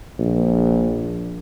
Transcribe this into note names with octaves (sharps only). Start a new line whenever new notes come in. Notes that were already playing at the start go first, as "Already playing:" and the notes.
A#1